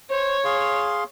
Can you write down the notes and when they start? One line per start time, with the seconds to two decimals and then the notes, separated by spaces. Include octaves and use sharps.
0.11 C5 C#5
0.45 G#4 F5 C6